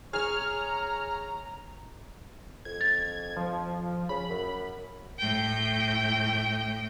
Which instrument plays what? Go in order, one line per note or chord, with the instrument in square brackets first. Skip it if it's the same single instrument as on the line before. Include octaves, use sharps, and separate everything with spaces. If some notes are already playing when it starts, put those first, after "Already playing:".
[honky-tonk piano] G#4 [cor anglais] C#5 [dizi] A#5 [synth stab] F6
[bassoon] F2 [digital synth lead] G#6
[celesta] A6
[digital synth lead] F3
[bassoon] C#3 [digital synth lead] B5
[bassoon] F#2
[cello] A2 G5